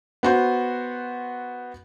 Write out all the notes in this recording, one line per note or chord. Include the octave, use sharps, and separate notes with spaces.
B3 F#4 C5